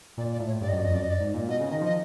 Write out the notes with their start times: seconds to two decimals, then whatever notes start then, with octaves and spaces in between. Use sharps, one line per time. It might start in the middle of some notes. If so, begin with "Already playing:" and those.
0.17 A#2 D5
0.32 D5
0.39 A2
0.47 C#5
0.61 G2 D5
0.69 D#5
0.72 F#2
0.78 D5
0.83 F2 D#5
0.94 F#2 D5
1.02 D#5
1.10 D5
1.20 G#2
1.34 A#2
1.48 B2 D#5
1.60 C#3
1.70 D#3 D#5
1.81 F3 D#5